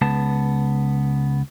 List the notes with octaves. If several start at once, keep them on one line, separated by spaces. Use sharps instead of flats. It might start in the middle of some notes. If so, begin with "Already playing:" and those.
C#2 B3 A5